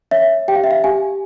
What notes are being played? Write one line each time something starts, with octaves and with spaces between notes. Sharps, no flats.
C#5 E5
G4 G5
F5
E5
F5
G4 G#5